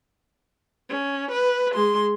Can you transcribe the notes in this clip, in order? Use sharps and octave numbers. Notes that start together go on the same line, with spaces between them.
C#4
B4
G#3 C6